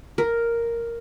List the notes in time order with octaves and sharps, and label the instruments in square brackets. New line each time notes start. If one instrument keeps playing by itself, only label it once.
[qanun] A#4